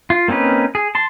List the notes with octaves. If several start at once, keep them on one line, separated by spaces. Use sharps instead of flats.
F4
A#3 C4 C#4 D#4 B4
G#4
A5 C6